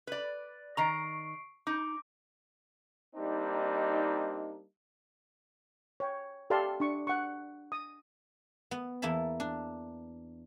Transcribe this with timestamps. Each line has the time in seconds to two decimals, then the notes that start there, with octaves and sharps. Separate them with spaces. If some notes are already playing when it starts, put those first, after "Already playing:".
0.07 B4 D5
0.77 D#3 A#5 C#6 C7 D7
1.67 D#4 D6
3.16 G3 A#3 C4 D4 D#4
6.00 C#5 G5
6.50 G4 A4 D5 F5 A5 C6
6.80 D4 C#6
7.07 F#5 C#6
7.72 D#6
8.71 B3
9.02 E2 A#3 E4 A5 B5
9.40 D4